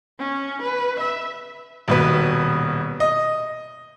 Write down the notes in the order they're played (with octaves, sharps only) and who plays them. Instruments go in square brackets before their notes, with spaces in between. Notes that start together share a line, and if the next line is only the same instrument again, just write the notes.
[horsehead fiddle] C#4
B4
E5
[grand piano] D#1 B2 B4
D#5